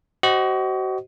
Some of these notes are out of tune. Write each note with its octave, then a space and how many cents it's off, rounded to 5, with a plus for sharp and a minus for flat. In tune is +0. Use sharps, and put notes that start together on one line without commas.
F#4 +35 C5 +0 D#5 +0